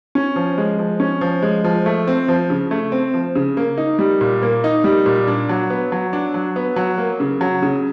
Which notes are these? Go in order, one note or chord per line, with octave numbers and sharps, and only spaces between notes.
C#4
F3
G#3
F3
C#4
F3
G#3
F3
A3
C4
F3
C#3
A3
C4
F3
C#3
A#3
D#4
G3
A#2
A#3
D#4
G3
A#2
D4
F#3
B3
F#3
D4
F#3
B3
F#3
A#3
C#3
F#3
C#3